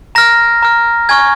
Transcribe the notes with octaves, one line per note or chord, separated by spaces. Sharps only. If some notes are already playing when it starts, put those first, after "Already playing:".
A#5 F6 A#6
A#5 F6
G#5 C#6 F6 G#6